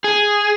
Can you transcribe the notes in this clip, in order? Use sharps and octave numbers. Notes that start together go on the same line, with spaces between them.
G#4